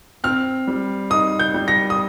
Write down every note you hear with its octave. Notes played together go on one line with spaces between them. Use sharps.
C4 F6
G3
D#4 D#6
G6
G3
A#6
D#6